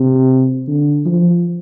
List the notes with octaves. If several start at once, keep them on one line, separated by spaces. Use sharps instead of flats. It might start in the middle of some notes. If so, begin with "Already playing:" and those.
Already playing: C3
D3
F3